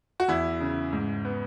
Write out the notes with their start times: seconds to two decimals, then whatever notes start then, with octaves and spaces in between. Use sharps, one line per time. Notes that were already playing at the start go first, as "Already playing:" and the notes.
0.20 F#4
0.28 E2 E4
0.60 C#3
0.93 G#2
1.25 B3